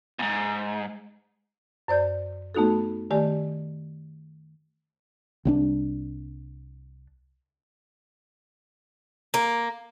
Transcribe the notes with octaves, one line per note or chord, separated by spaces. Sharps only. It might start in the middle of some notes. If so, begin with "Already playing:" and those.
E2 G#2
F#2 C5 D5 G6
A3 B3 D#4 F#4 A4
D#3 A3 G4 D5 G#5
C2 F#3 D4
A#3